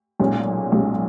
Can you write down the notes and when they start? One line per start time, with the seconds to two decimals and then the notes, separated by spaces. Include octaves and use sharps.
0.19 B1 A#2 G#3 C#4
0.72 B1 A#2 G#3 C#4